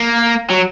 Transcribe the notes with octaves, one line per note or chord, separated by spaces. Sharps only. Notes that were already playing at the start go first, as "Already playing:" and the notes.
Already playing: A#3
F#3